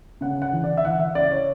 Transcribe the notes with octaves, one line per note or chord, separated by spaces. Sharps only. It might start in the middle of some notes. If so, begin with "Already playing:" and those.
C#3 F#5
F#5
E3
D5
E5
E3 F#5
E5
C#3 D5
C#5